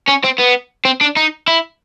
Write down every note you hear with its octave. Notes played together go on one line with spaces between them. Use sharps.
C#4
C4
B3
C4
D4
D#4
E4